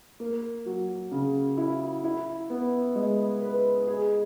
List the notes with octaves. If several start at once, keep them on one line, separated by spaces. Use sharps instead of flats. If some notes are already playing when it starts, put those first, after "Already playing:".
A#3
F#3
C#3
E4
E4
B3
G#3
B4
G#4